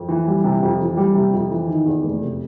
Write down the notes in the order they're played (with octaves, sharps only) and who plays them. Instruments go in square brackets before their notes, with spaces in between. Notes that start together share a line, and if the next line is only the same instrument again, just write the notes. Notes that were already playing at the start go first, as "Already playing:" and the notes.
Already playing: [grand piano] F2
E3
G3
C3
F2
E3
G3
C3
F2
E3
D#3
E2
F1
C3